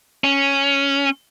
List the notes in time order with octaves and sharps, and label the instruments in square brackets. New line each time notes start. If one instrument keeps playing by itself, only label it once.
[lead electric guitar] C#4